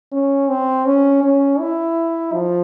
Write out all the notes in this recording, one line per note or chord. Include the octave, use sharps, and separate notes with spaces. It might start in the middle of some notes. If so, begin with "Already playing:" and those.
C#4
C4
C#4
C#4
E4
F3